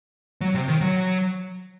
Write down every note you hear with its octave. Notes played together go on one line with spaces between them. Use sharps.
F#3
C3
D#3
F#3